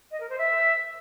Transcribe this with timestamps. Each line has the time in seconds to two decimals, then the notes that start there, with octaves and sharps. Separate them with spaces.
0.11 D#5
0.20 A#4
0.29 C5
0.38 E5